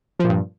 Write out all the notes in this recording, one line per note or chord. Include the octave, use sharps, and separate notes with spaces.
G2 A#2 F3